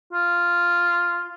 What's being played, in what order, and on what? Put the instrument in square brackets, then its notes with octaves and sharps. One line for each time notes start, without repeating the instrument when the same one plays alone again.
[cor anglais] F4